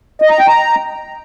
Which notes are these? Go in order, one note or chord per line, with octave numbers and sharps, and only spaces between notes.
D#5
A#5
G5
A#5